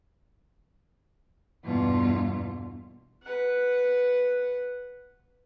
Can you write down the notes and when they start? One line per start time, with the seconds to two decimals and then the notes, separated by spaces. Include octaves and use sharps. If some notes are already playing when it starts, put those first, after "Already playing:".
1.63 E2 G2 B2 F4
3.23 B4 F#5